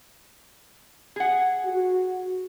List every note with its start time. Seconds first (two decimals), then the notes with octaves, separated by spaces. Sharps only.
1.16 G#4 F#5
1.65 F#4